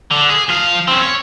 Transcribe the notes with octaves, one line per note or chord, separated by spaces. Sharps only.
D3
G#4
F3 F5
C4 C#4
C#5